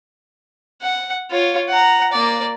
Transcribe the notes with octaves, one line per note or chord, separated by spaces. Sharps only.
F#5
F4 C#5
F#5 A#5
A#3 D5